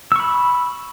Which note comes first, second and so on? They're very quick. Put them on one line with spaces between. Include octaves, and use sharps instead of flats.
E6 C#6 B5